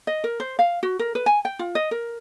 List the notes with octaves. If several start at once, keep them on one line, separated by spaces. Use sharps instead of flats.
D#5
A#4
C5
F5
F#4
A#4
B4
G#5
G5
F4
D#5
A#4